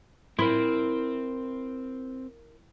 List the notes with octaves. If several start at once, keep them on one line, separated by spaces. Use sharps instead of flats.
C4 E4 A#4 C6